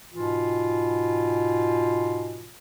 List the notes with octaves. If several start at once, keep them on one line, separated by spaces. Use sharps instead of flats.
G#2 B2 E3 F4